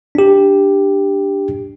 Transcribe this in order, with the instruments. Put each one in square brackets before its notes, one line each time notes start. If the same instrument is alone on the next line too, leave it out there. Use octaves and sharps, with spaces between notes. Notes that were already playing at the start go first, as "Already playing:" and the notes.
[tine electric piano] D4 G4